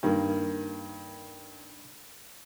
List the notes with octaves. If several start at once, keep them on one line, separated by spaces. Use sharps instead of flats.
G2 D#3 A#3